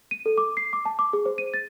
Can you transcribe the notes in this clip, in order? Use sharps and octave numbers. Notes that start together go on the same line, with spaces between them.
D#7
A4
D6
C7
D6
A5
D6
G#4
C5
D#7
A6